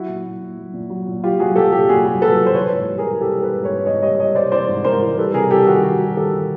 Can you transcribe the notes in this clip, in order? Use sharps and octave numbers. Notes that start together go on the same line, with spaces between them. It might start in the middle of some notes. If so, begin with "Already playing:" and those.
Already playing: F#3 E4 F#4
A#2
A#2
A#2
F#3
A#2
F#3
A#2
F#3 F4 G4
F#3 F#4 G#4
F#3 G4 A4
A#2 G4 A4
A#2 F#4 G#4
F#3
F#3 A4 B4
A#2
C5
E3 B4 C#5
G#2
G3
G#4 A#4
G3
E3 G4 A4
G3
A4 B4
G#2
B4 C#5
G#2
G#2 C#5 D#5
G3 C#5 D#5
G3 C#5 D#5
G3 C5 D5
E3 C5 D5
G#2
G#2 A#4 C5
E3
G3 A4 B4
C3 G#4 A#4
G3 G4 A4
D#3 F#4 G#4
G3 F#4 G#4
G3
A#4
D#3 G4 A4